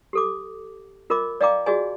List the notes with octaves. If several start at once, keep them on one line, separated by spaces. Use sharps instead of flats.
G4 A4 D6
F4 A#4 D#5 B5 D6
D5 D#5 F5 G5 A#5 D6
F4 F#4 G#4 D5 D#5 G#5